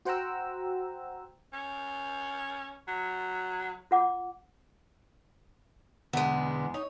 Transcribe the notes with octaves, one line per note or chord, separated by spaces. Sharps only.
F#4 C5 F#5 G5 A#5 E6
C#4
F#3
F4 F#5 D6
E2 B2 D3 G#3 B3
D#4 C#5